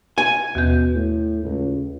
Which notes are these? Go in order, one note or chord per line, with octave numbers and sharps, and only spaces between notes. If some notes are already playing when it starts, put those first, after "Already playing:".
G#5
D#2 B2 G6
A2
C#2